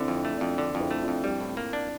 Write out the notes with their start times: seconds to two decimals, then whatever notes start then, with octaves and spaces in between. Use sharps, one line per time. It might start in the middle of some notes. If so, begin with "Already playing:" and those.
Already playing: D3 C4 E4
0.08 F2
0.13 D4
0.25 A3
0.36 F2 D4
0.57 D3 D4
0.75 F2
0.80 C4 E4
0.91 A3
1.02 D4 F4
1.08 F2
1.24 G3 C4 E4
1.41 A2
1.57 A#3
1.73 D4